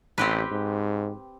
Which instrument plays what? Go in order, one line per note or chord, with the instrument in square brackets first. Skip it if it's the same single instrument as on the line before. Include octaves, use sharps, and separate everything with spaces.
[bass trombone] A1 [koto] C4 G4 B4
[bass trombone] G#2